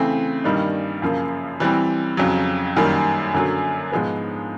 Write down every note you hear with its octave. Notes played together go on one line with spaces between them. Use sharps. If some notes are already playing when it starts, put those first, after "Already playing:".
Already playing: C#3 E3 A3 C4
G2 D#3 G3 A#3 D#4
F#2 C#3 F3 A#3
E3 G3 C4
F2 C#3 F#3
F#2 D#3 G3 A#3
F#2 D3 F#3 A#3
G#2 F3 G#3 B3